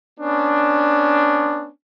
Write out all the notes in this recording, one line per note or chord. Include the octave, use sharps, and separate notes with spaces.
B3 C#4 D4